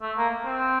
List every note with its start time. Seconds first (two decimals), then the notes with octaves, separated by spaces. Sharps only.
0.02 A3
0.17 A#3
0.46 C4